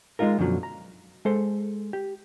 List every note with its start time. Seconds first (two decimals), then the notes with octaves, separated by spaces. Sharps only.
0.19 G#3 A#3 D#4 F4 A#4
0.39 F#2 B2 D3 F3 F#3
0.63 A#5
1.25 G#3 A4 C5
1.93 G4